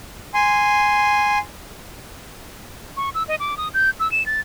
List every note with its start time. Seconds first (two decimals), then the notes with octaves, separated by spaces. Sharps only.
0.34 G#5 C6
2.97 C#6
3.15 E6
3.28 D#5
3.40 D6
3.57 D#6
3.74 G6
4.00 E6
4.12 E7
4.26 A6